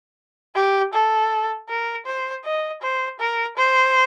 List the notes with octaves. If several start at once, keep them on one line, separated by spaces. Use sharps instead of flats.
G4
A4
A#4
C5
D#5
C5
A#4
C5